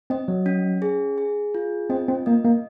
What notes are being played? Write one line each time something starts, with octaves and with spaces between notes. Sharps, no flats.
C4 D#5
F#3
C#4
G#4
G#4
F4
C4 D#5
C4
A#3 D#5
A#3